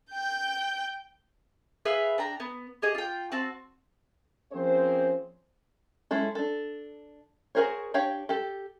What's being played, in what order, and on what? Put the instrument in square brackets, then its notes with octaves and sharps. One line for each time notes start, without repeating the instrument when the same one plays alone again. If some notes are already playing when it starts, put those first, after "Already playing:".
[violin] G5 G6
[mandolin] G#4 B4 E5 F5
D4 G5 A#5
B3
G4 G#4 D#5
F4 G5
C4 F#4 A5
[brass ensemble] F3 A#3 C4 C#4 G#4 C5
[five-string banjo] G#3 C#4 E4 A4
D4 A4
F#4 G#4 A#4 C5 C#5
D4 G4 C#5 F5 G5
G4 A4